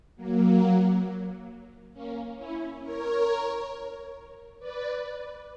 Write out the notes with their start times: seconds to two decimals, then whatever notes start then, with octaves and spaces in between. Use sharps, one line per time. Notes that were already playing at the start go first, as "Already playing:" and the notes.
0.16 F#3 A#3
1.93 A#3 C#4
2.38 C#4 E4
2.82 A#4 C#5
4.59 B4 D5